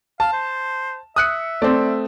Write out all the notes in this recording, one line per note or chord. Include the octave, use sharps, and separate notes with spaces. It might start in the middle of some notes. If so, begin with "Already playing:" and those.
F5 A5
C5
E5 D#6 F#6 C#7
A3 C4 D5